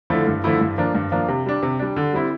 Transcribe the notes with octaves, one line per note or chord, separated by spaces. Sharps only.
D3 F3 A3 E4
G2
D3 F3 A3 E4
G2
F3 A#3 D4
G2
F3 A#3 D4
C3
G3 D4
C3
G3 D4
D3
G3 C4 E4